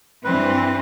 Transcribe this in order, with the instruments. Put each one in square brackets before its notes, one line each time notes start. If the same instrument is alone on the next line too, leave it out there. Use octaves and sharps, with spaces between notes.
[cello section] G2 E3 C4 [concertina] B4